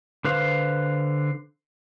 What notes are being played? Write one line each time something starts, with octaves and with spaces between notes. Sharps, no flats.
D3 B4 C5 F5